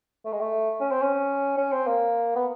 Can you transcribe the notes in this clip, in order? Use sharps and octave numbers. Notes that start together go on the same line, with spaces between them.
A3
G#3
A3
C#4
C4
C#4
C#4
C4
A#3
B3